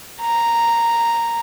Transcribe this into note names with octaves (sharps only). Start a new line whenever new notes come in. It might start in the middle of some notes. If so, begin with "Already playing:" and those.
A#5